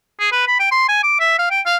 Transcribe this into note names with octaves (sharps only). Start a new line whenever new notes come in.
G#4
B4
B5
G5
C6
G#5
D6
E5
F5
G5
F5